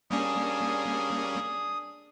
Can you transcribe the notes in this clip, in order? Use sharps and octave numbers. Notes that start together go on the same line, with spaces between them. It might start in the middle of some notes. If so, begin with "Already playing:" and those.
G3 A#3 C#4 D4 G#4 D#6